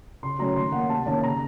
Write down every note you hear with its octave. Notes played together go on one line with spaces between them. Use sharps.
C#3 C6
F#3 A3 C#4 A#5
D#3 C6
A#3 F#5
C#4
C3 A5
D#3 A#3 C#4 A5
C#3 A#5